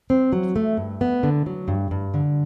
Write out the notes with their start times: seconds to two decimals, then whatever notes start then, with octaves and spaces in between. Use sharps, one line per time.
0.10 C4
0.32 F#3
0.56 A3
0.77 G2
1.01 B3
1.23 D3
1.46 F#3
1.68 G2
1.91 G2
2.14 D3